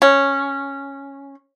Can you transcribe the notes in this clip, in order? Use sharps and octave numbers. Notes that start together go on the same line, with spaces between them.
C#4